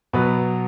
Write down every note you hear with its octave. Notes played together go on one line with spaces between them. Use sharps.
B2 F#3 B3 B4